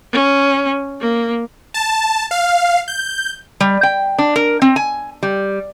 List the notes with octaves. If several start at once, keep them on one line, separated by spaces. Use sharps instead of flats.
C#4
A#3
A5
F5
G6
G3
G5
D4
A#4
C4
G#5
G3